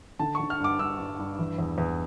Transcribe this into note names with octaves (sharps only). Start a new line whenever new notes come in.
D3 A5
D3 C#6
F6
G2 D6
G2 E6
G2
G2
E3
E2
E2